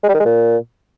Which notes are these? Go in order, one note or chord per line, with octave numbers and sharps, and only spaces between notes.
G#3
G3
D#3
G#3
A#2